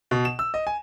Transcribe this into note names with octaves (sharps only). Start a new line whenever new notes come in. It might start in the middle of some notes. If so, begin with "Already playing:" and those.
B2
E7
E6
D#5
G#5